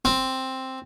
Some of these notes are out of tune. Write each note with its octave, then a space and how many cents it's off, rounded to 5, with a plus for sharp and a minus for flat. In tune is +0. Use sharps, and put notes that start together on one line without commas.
C4 +5